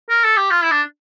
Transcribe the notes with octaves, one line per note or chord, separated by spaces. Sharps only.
A#4
A4
G4
F4
E4
D4